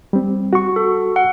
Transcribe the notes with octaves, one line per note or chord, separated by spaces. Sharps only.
G3 C4
F#4 C#6
A4
F#5